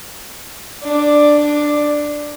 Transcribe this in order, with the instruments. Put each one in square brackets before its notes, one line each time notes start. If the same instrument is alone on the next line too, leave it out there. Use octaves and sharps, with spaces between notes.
[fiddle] D4 D5